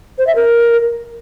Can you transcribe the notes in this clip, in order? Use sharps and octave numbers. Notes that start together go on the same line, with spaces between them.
C5
E5
A#4